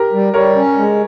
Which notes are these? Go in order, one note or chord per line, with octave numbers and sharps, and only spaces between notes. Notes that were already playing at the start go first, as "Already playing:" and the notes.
Already playing: G4 A#4
G3
G3 A#4 C#5
C#4
G#3